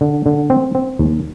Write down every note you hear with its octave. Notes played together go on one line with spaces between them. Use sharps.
D3
D3
C4
C4
D#2